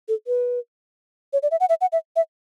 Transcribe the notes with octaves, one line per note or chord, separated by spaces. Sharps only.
A4
B4
C#5
D5
E5
F#5
E5
F#5
E5
E5